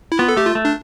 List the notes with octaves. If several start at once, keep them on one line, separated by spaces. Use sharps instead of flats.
E4
B3 F4
A4
A3 G4
F4
A3
D4